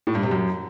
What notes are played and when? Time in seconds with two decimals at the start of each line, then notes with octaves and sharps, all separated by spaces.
0.07 A2
0.15 G2
0.23 C3
0.31 F#2